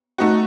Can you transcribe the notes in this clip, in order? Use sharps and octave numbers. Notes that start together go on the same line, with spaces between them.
A3 D#4 F#4